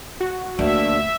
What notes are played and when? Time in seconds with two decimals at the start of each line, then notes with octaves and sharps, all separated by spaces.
0.20 F#4
0.59 D2 A#3 D4 E5